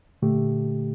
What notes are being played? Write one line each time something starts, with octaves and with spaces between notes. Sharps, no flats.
A#2 D3 A3 G4